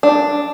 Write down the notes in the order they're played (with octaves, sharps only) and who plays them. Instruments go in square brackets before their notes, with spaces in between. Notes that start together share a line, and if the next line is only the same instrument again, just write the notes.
[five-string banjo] D4